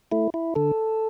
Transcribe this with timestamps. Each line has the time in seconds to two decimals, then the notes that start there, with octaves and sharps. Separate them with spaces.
0.12 A3 E4
0.34 E4
0.55 D3 A4